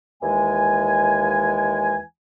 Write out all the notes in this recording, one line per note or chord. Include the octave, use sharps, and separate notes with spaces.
D#2 E3 G#3 G#5